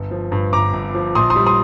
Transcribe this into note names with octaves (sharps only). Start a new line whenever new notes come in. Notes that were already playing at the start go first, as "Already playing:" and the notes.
Already playing: G1
F3
G2
G1 A#5 D6
G1
F3
A#1 C6 D#6
C6 D#6
G3
C6 D#6